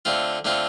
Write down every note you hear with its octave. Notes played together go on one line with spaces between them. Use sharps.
D3 A3 C4 F4
D3 A3 C4 F4